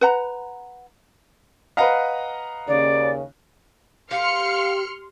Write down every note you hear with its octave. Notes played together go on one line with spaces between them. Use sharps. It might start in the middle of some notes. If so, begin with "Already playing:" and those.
B4 F#5 A#5
B4 D#5 F5 F#5 A#5
D#2 C#3 D5
G4 F5 C6 F6 C#7